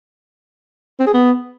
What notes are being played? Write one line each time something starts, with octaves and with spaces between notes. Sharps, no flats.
C4
G#4
B3